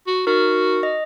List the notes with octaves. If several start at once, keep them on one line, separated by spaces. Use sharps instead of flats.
F#4
D#4 F#4 A#4
D#5